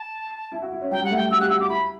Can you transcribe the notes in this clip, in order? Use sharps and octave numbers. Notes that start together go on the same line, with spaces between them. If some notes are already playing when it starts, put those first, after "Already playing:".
Already playing: A5
E4
F#4
E4
C#4
F#3 G5
G3
F#5
A3
G5
F#4 E6
G4 F#6
F#4 E6
F#4 D6
E4 B5